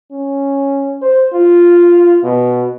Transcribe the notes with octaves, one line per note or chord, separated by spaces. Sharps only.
C#4
C5
F4
B2